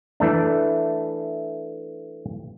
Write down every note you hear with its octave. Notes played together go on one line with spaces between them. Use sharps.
E3 A3 D4